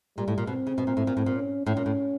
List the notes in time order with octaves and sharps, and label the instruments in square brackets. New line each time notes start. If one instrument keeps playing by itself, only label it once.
[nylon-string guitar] A#2 [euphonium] G3
[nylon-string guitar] A2
A#2
[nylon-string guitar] B2 [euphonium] C4
[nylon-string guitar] C#3
B2
A#2
A2
A#2
A2
A#2
[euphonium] C#4
[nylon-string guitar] A2 [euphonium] C#4
[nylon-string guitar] A#2
A2